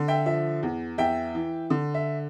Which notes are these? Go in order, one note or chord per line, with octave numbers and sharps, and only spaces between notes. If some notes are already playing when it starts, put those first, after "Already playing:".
Already playing: D3
E5 G5
F3 E5
E2
E2 E5 G5
E3
D3
E5